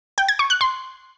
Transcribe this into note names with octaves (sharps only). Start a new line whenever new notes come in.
G5
G#6
C#6
F#6
C6